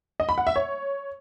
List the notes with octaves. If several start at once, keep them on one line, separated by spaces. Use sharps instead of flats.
D#5
B5
F#5
E5
C#5